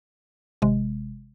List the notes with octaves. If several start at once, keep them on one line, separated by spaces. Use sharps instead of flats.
G#1 C3 G#3